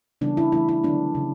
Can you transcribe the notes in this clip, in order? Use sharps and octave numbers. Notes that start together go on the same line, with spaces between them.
C#3 E3 G3 B3 D4
E4
E3 A3 E4
E4
D3 F#3 B3 D4
C#3 E3